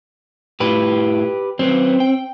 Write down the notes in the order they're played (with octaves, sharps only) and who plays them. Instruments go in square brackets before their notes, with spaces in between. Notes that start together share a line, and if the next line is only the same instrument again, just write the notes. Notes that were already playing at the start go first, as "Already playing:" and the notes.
[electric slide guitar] A2 E4 F4 [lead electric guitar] G4 B4
[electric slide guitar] F#3 C#4 B4 [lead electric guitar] C4
[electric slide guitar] G5